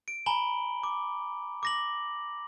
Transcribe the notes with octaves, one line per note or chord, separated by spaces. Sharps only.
D7
G#5 A#5 B5 F#7 G7
D6
D6 A#6 F#7